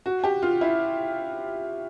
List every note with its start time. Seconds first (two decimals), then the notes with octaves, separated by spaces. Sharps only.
0.06 F#4
0.24 G4
0.43 F4
0.61 E4